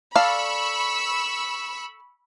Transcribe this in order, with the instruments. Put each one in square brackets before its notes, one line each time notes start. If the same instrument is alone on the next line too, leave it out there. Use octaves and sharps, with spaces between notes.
[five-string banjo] A4 D5 F5 [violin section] B5 C#6 E6